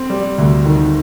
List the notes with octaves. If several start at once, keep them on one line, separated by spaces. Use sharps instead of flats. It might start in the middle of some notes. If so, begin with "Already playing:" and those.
Already playing: C4
G3
D2
D#3